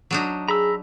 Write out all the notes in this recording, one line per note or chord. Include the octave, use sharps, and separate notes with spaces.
F#3 D4 D#4
G#4 A#5 B5 E6